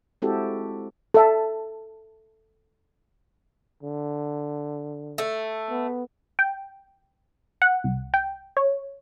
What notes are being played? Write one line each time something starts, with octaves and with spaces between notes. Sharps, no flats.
G#3 C4 E4 F#4 G4 A4
A4 E5 A5
D3
A3
B3
G5
F#5
C2
G5
C#5